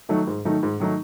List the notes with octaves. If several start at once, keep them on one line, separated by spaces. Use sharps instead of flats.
D#3 F#3 A3 D#4
G#2
D#3 F#3 A3 D#4
G#2
D#3 F#3 A3 D#4